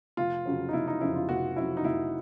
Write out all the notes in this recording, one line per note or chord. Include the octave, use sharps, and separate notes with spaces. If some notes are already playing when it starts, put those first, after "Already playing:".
F1 F4
F2 C#3 F#3
D#4
F1 E4
D#4
F2 C#3 F#3 E4
F4
F1 F#4
F2 C#3 F#3 E4
D#4
F1 E4